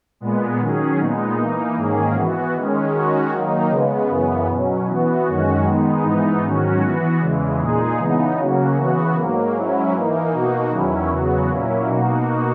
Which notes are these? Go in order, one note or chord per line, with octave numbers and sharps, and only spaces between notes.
A#2 G#3 B3
D#3 F#3 C#4 G#4
A#2 G#3 B3 D#4
E3 A#3 D#4
G#2 D#3 A#3 C#4 G#4
E3 B3 F#4
D#3 G#3 C#4
D#3 G#3 C#4 F#4
D#3 F#3 A#3 D#4
C#3 G#3 B3
F#2 C#3 E3 B3
B2 F#3 C#4
E3 B3 F#4
F#2 D#3 G#3 C#4 F#4
D#3 G#3 B3 D#4
G#2 E3 B3 D#4
G#2 D#3 F#3 C#4 F#4
E3 B3 F#4
E2 C#3 E3 G#3
A#2 G#3 D#4 G#4
C#3 E3 B3 D#4
C#3 F#3 A#3 C#4 F#4
C#3 E3 B3 F#4
G#2 F#3 A#3
G#2 F#3 C#4 E4
E3 A#3 D#4
B2 A#3 D#4 F#4
E2 D#3 F#3 C#4 E4
E2 C#3 F#3 B3 F#4
A#2 F#3 A#3 C#4 E4
B2 A#3 D#4 F#4